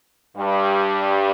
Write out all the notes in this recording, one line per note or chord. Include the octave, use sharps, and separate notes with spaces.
G2 G3